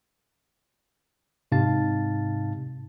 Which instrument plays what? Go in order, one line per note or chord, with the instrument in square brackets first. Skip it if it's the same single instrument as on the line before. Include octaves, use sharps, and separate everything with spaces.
[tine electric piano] G#2 C3 D#4 F5 A5 A6